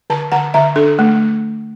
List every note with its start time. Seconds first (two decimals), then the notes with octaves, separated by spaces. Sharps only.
0.10 D3 A5
0.32 D3 F#5
0.54 D3 E5
0.76 D4 A4
0.99 A3